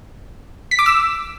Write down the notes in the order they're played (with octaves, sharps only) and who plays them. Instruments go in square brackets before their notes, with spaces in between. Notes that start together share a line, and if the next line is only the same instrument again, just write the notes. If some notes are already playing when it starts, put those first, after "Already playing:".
[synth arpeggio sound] B6
D6
E6